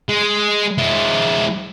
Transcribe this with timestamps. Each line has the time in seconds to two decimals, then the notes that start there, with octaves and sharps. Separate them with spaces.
0.09 G#3
0.78 G#3 E4